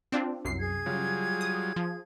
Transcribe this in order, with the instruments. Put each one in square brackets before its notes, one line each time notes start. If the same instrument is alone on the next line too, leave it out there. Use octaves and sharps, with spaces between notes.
[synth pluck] C4 D4 F4
C2 F#2 C7
[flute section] G#4 G#6
[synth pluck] C#3 [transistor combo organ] F#3 G3 F4
[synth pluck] D#6
F3